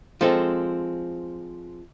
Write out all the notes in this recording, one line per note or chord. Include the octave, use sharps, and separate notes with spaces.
F3 G#3 C4 A4